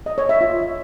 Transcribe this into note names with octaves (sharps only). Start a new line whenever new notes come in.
D#5
C#5
E5
F4